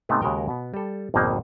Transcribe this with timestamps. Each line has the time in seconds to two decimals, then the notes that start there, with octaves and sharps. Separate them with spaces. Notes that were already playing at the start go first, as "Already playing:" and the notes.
0.09 G#2 C3 A3 B3 C#4 D#4
0.22 D#2 C#3 G#3 F#4 A#4 G5
0.48 B2 B3
0.74 G3 A4
1.14 G#1 F2 B2 A#3 D#4